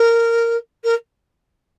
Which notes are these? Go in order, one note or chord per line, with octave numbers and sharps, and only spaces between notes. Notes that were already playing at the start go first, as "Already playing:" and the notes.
Already playing: A#4
A#4